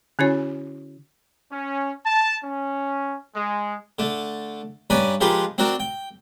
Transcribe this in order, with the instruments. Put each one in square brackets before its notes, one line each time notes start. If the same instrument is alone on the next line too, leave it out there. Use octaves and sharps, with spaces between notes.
[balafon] D3 C#4 E4 F#4 C#5
[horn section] C#4
A5
C#4
G#3
[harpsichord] D3 A3
G2 C#4 B4 D5 G#5 A#5
F3 G#3 F4 G4 A#4 B4
C4 D4 F#4 A#4
G5